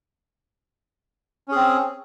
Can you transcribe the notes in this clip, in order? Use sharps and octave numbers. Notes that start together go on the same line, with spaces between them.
C4 C#4 G#4